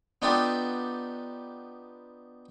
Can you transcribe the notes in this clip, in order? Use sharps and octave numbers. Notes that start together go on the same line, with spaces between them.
B3 D4 D#4 F4 G4 A4